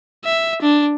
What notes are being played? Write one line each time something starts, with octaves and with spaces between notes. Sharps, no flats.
E5
D4